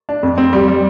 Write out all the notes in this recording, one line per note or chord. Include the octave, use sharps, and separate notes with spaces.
D4
F2
C4
G3
G3